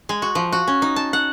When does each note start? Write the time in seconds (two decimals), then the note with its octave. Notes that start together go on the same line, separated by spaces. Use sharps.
0.09 G#3
0.22 F#4
0.35 F3
0.52 F#4
0.67 C#4
0.82 D#4
0.96 A5
1.13 F#5